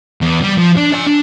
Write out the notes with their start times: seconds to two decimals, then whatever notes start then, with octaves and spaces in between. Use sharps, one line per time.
0.22 E2
0.44 G3
0.58 F3
0.78 D4 D5
0.93 D5 G#5
1.07 D4